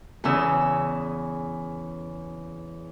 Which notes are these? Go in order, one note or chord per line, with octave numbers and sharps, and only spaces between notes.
E2 C#3 E6